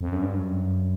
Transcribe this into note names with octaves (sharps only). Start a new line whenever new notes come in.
F2
F#2
G2
F#2